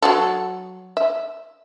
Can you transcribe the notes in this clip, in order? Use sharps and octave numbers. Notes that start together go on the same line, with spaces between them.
F#3 F#4 A4
E5